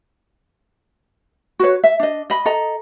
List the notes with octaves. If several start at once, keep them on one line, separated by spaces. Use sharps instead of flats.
F#4 B4 C#5
E5
D4 D#5
D#5 B5
A4 D#5 A#5